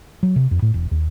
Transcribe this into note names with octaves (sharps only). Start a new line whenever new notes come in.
F#3
C3
F2
A2
E1
D#2